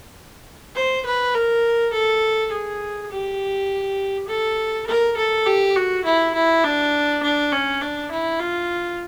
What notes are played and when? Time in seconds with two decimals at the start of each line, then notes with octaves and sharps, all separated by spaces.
0.75 C5
1.05 B4
1.34 A#4
1.93 A4
2.51 G#4
3.11 G4
4.28 A4
4.87 A#4
5.17 A4
5.46 G4
5.76 F#4
6.05 E4
6.34 E4
6.64 D4
7.23 D4
7.52 C#4
7.81 D4
8.11 E4
8.40 F4